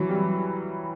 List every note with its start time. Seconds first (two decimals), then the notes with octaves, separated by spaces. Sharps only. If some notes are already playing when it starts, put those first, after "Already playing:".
Already playing: E3 F#3
0.09 G3